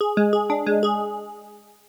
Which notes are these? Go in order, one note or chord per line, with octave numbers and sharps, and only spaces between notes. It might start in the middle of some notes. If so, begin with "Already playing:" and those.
G#4
G#3
G#4
D4
G#3
G#4